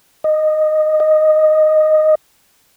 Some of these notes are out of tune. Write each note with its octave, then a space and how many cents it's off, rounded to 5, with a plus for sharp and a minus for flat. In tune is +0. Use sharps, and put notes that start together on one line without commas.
D#5 -10
D#5 -5